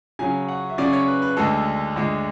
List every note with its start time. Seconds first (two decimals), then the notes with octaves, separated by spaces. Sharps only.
0.19 C#3 F#3 C#4 G#5
0.48 F#5
0.70 E5
0.78 C#3 F#3 C#4 D5
0.93 C#5
1.08 B4
1.22 B4
1.37 D2 D3 G#3 A4
1.96 D2 D3 G#3